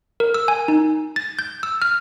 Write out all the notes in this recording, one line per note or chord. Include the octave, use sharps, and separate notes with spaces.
A#4
E6
G#5
D#4
A6
G6
E6
F6